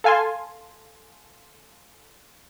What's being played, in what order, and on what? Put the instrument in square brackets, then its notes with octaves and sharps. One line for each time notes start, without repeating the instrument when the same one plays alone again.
[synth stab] A4 F5 G#5 A5 C6